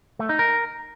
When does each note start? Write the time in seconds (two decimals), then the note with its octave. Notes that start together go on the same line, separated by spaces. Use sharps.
0.19 A3
0.29 D#4
0.39 A#4